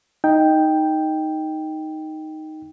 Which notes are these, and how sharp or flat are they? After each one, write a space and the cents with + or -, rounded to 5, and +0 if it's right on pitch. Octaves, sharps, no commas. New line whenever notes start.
D#4 +0 G5 +0